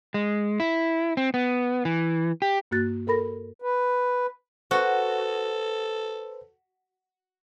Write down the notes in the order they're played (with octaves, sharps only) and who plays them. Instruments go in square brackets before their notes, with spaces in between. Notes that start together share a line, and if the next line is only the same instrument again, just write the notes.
[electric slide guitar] G#3
E4
C4
B3
E3
G4
[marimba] G2 A#3 F#4 F#6 A6
A4 A#4 B5 A#6
[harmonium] B4
[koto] F#4 [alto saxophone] A4 [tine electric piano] B4 C5